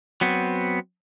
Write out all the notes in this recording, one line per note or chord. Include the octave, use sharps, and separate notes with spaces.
F#3 B3 C4